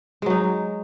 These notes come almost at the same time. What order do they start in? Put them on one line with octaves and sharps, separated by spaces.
G#3 F#3 D#4